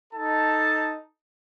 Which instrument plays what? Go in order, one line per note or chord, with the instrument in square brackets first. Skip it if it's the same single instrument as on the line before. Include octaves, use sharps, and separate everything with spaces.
[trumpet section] D#4 A4 A5